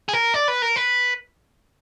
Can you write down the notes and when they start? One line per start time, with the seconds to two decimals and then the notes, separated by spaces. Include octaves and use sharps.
0.09 G#4
0.13 A#4
0.34 D5
0.48 B4
0.62 A#4
0.76 B4